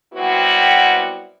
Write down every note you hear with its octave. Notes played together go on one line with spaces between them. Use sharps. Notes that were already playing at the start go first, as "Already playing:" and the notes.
F#3 G3 B3 C4 E4 F#4